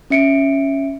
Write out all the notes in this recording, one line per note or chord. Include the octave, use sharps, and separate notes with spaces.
C#4 E5 C#7 D7